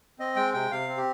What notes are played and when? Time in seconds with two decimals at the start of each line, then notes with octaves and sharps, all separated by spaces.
0.19 C4 D#5
0.36 G#3 G5
0.54 C3 G5
0.71 C3 F5
0.88 C4
0.97 G4